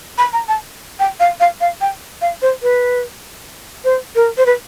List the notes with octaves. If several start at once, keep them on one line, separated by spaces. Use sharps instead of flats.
B5
A#5
A5
G5
F5
F5
F5
G5
F5
C5
B4
C5
A#4
C5
B4